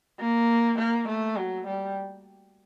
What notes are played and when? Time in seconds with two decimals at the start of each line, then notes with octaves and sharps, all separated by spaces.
0.20 A#3
0.78 A#3
1.08 A3
1.36 F#3
1.67 G3